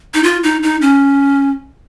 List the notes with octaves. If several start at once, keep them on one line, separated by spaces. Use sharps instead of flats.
D#4
F4
D#4
D#4
C#4